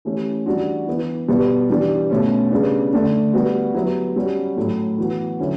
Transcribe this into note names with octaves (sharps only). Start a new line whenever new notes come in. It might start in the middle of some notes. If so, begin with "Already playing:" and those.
E3 A3 C#4 G4
E3 G3 D4 F#4
E3 B3 E4
B2 G3 B3 E4 G4
E3 G3 D4 G4
B2 A3 C#4
C#3 G3 B3 D4
D3 A3 D4
G3 B3 F#4
F#3 B3 E4 G4
G3 C#4 F#4
A2 F#3 A3
E3 B3 F#4
D3 F#3 C#4 E4